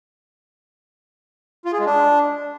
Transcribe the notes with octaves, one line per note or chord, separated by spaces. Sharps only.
F4
G#4
G#3
D4